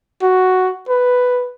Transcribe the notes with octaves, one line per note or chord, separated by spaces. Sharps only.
F#4
B4